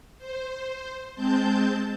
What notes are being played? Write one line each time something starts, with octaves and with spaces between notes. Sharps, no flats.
C5
G#3 C4 A5 G6